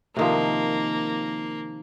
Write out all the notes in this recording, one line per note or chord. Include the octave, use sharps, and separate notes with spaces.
C3 D#3 F3 A#3